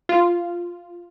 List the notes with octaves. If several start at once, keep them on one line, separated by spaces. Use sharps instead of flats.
F4